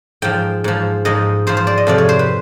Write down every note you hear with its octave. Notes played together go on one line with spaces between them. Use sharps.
G#2 F3 G5
G#2 F3
G#2 F3 D#5
G#2 F3 C5
C5
D5
D#5
F2 C3 F3 D5
C#5
C5
B4